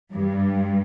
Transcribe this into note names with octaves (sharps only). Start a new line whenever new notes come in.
G2